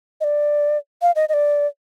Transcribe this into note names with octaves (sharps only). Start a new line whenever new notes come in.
D#5
D5
F5
D#5
D#5
D5